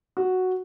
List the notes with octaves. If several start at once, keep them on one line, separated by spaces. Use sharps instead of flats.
F#4